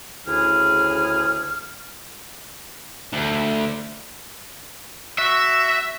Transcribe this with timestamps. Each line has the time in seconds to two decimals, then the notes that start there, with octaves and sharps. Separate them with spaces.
0.26 D2 C#3 E4 G#4 F6
3.13 D2
5.18 F#4 E5